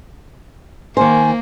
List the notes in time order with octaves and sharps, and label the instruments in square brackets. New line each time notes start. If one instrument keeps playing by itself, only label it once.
[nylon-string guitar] D#3 C5 [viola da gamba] A#3 [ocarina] G#5